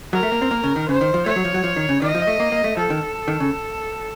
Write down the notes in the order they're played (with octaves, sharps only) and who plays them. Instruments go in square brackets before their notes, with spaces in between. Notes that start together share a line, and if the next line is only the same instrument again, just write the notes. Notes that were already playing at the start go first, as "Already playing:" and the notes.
[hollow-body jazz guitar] F#3 [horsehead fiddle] A#4
[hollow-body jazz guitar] A3
A#3
C4
A#3
C#3
D#3
[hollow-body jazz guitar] C#3 [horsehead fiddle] C5
[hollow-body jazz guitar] D#3
F3
[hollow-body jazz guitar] A3 [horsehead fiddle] C#5
[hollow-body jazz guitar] F#3
F3
F#3
F3
D#3
C#3
[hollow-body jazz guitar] D#3 [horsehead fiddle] D#5
[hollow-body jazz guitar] F3
A3
A#3
A#3
A3
[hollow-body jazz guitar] F3 [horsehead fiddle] A4
[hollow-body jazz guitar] D#3
D#3
C#3